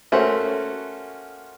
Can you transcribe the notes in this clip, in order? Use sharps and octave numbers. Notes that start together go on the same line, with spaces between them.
A3 A#3 C#4 F#4 C5 F#5